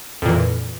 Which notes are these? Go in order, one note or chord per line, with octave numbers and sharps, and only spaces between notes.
F2 A#2 E3